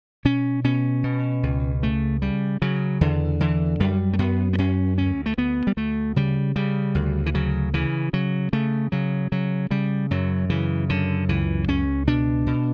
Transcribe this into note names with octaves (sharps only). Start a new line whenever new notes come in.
B2 C#4
B2 C#4
B2
C#2
C#3 A3
C#3 G3
C#3 F#3
E2 D3
D3 E3
F#2 G3
A3
F#2 B3
B3
F#2 C#4
D2 C#4
A3
D2 B3
G3
D2 A3
C#3 G3
C#3 G3
D2
E3
C#3 F#3
C#3 E3
C#3 F#3
C#3 A3
C#3 F#3
C#3 F#3
C#3 G3
F#2 F#3
C#3 E3
F#2 D3
C#2 E3
C#2 C#4
B2 D4
B2